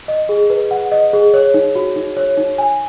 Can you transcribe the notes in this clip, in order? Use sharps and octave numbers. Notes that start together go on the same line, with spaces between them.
D#5
G#4
B4
F#5
D#5
G#4
C#5
D#4
F#4
D#4
C#5
D#4
G#5